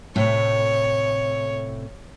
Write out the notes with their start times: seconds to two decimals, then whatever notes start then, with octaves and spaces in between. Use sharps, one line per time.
0.16 A2 C3 A3 C#5